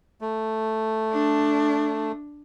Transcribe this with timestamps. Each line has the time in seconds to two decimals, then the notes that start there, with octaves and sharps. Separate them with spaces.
0.21 A3
1.12 D4